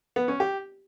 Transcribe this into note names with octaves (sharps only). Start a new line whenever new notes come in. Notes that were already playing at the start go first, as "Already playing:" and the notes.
B3
C#4
G4